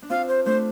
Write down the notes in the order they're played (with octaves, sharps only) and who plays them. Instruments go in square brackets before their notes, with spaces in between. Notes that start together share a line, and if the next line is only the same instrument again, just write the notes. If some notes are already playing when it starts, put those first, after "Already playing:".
[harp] D4
[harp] C4 F4 [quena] F5
[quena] C5
[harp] A3 D4 [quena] C5